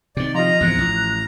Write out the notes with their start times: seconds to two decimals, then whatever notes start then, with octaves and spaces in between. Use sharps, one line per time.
0.17 C3 D#3 D5
0.35 F3 F4 G4 D#5 A#5
0.61 E2 G#2 C3 F#6
0.78 A1